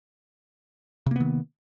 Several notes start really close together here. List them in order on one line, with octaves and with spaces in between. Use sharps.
C3 A#3 B3 D#3